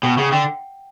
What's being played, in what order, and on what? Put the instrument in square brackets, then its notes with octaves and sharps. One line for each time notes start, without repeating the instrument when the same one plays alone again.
[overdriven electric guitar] B2 [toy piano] G5
[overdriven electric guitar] C#3 [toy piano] F#5
[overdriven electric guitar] D3 [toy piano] G5